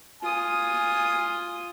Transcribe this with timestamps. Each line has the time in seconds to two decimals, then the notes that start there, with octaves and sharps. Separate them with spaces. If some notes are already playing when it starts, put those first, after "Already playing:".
0.23 F4 G#5 D#6